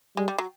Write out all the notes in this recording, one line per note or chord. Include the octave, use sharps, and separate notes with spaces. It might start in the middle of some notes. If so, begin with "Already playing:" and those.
G3 G#3
G3
F#3